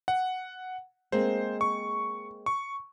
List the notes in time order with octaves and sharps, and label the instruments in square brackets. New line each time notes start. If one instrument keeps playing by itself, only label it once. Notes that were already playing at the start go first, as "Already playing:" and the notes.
[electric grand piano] F#5
[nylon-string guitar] G#3 A#3 C4 [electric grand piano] C5
[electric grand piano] C#6
C#6